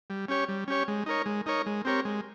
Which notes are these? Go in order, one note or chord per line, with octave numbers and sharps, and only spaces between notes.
G3
C#4 G4 C#5
G3
C#4 G4 C#5
G#3
D#4 A#4 C#5
G#3
D#4 A#4 C#5
G#3
C4 G4 A#4 C#5
G#3